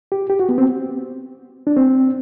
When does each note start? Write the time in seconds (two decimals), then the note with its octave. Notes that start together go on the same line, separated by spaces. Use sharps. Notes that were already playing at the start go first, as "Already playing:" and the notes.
0.12 G4
0.30 G4
0.39 F#4
0.49 B3
0.58 C4
1.67 D4
1.77 C4